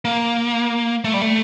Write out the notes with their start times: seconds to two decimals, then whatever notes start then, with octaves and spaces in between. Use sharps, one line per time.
0.05 A#3
1.04 A3
1.14 G3
1.22 A3